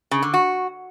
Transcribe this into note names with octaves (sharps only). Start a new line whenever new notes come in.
C#3
D3
F#4